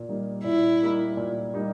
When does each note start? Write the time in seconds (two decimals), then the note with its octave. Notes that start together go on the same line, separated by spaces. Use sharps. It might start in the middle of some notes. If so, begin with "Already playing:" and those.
Already playing: A#2
0.09 G3 A#3 D#4
0.44 A#2 E4
0.81 G3 A#3 D#4
1.17 A#2
1.54 G3 A#3 D#4